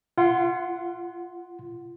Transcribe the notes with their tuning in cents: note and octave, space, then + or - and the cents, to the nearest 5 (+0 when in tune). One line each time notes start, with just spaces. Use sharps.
F4 -35 F#5 +0 C6 +0